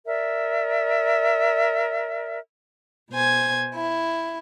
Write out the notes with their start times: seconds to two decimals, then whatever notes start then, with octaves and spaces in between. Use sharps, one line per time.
0.05 A#4 D5 E5
3.10 B2 C5 G#5 G#6
3.74 E4